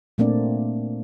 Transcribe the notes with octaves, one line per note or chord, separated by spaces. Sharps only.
A#2 A3 A#3 C4 D4 D5